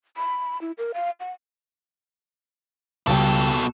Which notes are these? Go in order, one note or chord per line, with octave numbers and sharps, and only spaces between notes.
B5
E4
A#4
F5
F#5
C#2 B2 G3 A4 G5